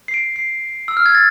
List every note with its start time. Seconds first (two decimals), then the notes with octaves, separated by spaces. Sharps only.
0.08 C7
0.14 D7
0.36 C7
0.88 E6
0.97 F6
1.06 G#6
1.15 A6